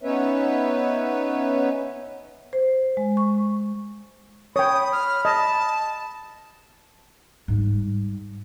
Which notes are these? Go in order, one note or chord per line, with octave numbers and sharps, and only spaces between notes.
B3 C#4 D#4 B4 C#5 E5
C5
G#3
C#6
C#5 G5 B5 D#6
F6
D#5 A5
G#2 G3